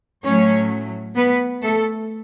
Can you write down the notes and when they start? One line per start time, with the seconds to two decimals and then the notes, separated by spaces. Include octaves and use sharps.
0.24 A2 F#3 A3 C#4 C#5
1.16 B3 B4
1.62 A3 A4